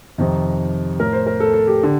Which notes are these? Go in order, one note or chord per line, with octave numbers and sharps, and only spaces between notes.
F2 C3 D#3 D#4
A2 A#4
C5
A#4
A4
A4
G4
D3